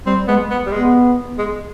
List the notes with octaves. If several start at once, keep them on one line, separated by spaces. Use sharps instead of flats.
G3 C4
G#3 B3
B3
G3
G#3 B3
G#3